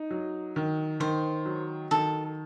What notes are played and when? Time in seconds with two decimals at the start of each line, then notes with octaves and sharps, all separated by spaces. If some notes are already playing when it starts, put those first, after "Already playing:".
Already playing: D#4
0.10 F#3
0.56 D#3
1.00 D#3 C5
1.46 F#3
1.91 D#3 A4